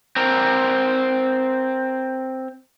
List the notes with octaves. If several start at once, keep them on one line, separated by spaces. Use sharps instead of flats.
C4 A#4